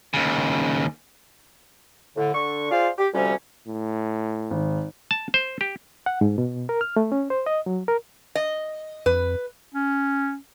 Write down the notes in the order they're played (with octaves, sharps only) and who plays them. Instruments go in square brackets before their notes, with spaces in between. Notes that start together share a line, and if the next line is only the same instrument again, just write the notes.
[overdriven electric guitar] D#2 C#3
[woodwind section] A2 D3
D3 C#6
F4 G#4 C5 D5 F5
G4
D2 C3 F3 G3 C#4
[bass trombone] A2
[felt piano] G#1
[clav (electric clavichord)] A5
C5
G4
[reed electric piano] F#5
G#2
B2
A#4
F6
A3
C#4
C5
D#5
F#3
A#4
[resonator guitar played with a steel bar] D#5
[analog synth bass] F2 [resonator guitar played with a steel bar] B4
[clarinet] C#4